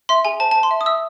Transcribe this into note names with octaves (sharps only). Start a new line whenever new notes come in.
E5 C6
G#4 G#5
C5 A5
A5
C5
C6
E5
D#6
E5 E6